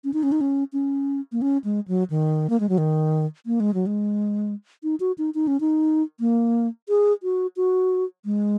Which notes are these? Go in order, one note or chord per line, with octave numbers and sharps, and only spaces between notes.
C#4
D#4
C#4
D#4
C#4
C#4
A#3
C#4
G#3
F#3
D#3
A#3
G#3
F#3
D#3
A#3
G#3
F#3
G#3
D#4
F#4
D#4
D#4
C#4
D#4
A#3
G#4
F#4
F#4
G#3